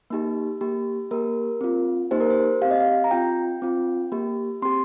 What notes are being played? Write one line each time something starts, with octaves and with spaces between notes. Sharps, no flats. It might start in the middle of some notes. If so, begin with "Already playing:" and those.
A#3 D#4 G4
A#3 G4
A#3 G4 A#4
C4 F4
A#3 D#4 G4 C5
A#4
C5
C4 G4 F5
D#5
F5
A#5
C4 F4 G5
C4 F4
A#3 G4
C4 G4 C6